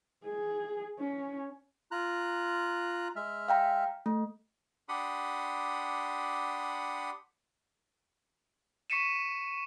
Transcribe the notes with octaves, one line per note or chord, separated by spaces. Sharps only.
G#4
C#4
F4 A#5 F#6
G#3 E5 F6
F5 G5 A#5
A3
D4 G4 F#5 B5 C6 D#6
C#6 B6 C#7 D#7 E7